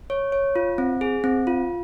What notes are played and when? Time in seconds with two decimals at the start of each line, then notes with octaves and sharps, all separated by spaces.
0.10 C#5
0.32 C#5
0.56 F4
0.78 C4
1.01 G#4
1.24 C4
1.47 F4